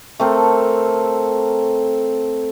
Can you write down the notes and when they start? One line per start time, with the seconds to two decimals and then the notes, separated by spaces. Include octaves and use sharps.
0.20 A3 C4 A4 A#4